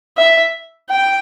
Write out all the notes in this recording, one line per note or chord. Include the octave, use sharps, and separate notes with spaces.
E5
G5